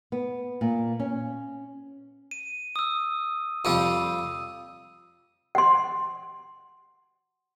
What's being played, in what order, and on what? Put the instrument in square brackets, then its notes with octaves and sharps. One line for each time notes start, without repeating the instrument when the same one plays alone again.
[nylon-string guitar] B3
A#2
C#4
[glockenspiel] D#7
D#6 E6
[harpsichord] F2 F3 G3 [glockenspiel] E6 D#7
[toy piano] F#5 C6